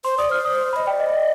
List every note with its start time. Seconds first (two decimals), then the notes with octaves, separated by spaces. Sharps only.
0.05 C5 C6
0.18 D5 D#6
0.30 C5 F6
0.45 D#6
0.73 D#5 B5
0.86 D5 G5
1.00 D#5
1.14 D#5